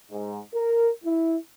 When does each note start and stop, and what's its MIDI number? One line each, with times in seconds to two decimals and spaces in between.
0.11 0.40 44
0.54 0.90 70
1.04 1.35 64